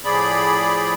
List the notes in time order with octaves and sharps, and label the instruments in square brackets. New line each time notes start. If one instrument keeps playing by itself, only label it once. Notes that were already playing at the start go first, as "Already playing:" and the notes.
[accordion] A2 F3 G#4 D5 B5